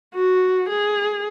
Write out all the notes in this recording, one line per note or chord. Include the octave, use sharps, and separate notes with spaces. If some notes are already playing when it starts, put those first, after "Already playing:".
F#4
G#4